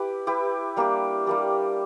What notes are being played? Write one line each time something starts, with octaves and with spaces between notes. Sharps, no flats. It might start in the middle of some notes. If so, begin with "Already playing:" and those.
Already playing: E4 G4 B4
E4 G4 B4
G3 A#3 D4 G4
G3 A#3 D4 G4